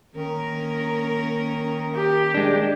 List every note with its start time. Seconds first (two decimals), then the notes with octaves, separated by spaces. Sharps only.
0.15 D#3 A#3 C#4 A#4
1.96 G4
2.34 G#3 D4